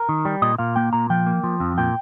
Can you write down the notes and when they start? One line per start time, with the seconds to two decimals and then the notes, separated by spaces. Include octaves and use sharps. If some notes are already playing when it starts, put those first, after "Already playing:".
Already playing: A#4
0.09 D#3
0.25 G3
0.42 A#2 D#5
0.58 A#2 F5
0.76 A#3 G5
0.93 A#2 A#5
1.10 F3 G5
1.26 A#3
1.44 F3
1.60 F2
1.78 A#2 G5